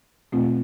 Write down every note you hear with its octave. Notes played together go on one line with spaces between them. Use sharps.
B2 A3 C4 F4